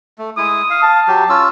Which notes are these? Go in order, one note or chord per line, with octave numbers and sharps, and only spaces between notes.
A3
G#3 E4 D#6
F5
A5
F#3 G4
C#4 F4 E6